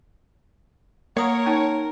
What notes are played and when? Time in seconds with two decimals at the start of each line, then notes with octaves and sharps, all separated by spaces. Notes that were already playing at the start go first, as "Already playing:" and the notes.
1.17 A#3 A#4 C#5 F#5 D#6
1.46 C#4 D#4